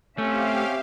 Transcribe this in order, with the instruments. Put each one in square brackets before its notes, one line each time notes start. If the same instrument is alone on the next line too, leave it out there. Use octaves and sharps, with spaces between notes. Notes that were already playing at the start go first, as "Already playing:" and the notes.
[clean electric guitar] A3 [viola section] C4 E5 [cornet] C#4 [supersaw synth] G4 F5